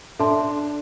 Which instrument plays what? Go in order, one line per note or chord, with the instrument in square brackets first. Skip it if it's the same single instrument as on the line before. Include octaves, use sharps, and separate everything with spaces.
[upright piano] D4 [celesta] A4 E5 A5 C6